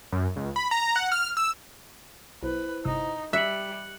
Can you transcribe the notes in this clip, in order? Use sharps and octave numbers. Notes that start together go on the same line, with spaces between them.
F#2
C#2
B5
A#5
F#5
F6
E6
B1 E4 B4 C5
G1 C3 D#4 D#6
G3 E5 F#6 C#7 F#7